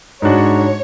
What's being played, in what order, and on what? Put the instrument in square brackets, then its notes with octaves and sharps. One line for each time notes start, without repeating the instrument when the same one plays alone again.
[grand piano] G#2 G#3 D4 F#4 [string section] C#5